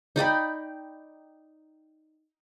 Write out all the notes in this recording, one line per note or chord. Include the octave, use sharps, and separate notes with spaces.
D#4 D5 G5 B5